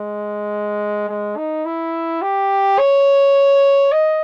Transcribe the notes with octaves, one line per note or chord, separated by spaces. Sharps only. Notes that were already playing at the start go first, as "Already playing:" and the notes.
Already playing: G#3
G#3
D#4
E4
G4
C#5
D#5